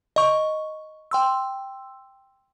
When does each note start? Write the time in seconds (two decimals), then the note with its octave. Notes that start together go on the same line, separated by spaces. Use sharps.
0.16 D#5 C#6
1.11 G5 C6 E6